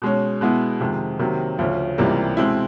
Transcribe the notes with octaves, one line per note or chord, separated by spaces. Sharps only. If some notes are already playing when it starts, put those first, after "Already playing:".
B2 G#3 C#4
B2 G#3 B3 E4
F2 C3 D#3 G#3
C3 D#3 F#3 A#3
D2 C#3 F3
C#2 C3 E3 G3 A#3
B2 G#3 C4 E4